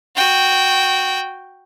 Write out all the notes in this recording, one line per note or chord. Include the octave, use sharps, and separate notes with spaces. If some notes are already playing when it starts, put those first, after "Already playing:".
F#4 G5